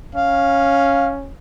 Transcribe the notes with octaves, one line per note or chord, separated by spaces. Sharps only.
C#4 F5